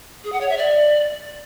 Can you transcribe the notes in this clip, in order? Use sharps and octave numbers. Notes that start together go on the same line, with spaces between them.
G#4
F#5
C#5
E5
D5